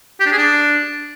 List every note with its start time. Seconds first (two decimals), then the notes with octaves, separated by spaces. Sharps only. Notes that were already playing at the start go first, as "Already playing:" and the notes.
0.20 G4
0.26 D4
0.32 G#4
0.38 D4